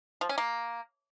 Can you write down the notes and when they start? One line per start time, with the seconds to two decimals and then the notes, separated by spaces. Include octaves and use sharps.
0.21 F3
0.29 C#4
0.38 A#3